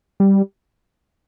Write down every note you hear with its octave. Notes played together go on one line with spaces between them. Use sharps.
G3